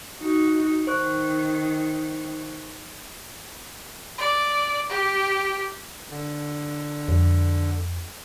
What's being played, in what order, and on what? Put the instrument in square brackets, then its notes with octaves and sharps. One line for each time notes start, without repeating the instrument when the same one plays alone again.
[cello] D#4 F#4
[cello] D#3 [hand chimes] C5 C#6 F#6
[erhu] D5
G4
[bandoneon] D3
[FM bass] F2